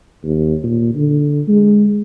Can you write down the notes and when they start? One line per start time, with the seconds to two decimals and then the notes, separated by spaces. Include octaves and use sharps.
0.24 D#2
0.64 A#2
0.95 D3
1.48 G#3